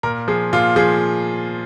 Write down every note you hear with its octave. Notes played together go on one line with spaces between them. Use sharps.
A#2 A#4
F3 G#4
A#2 F4
F3 G#4